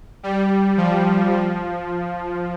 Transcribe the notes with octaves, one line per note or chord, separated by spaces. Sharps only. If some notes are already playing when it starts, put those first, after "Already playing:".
G3
F3
F3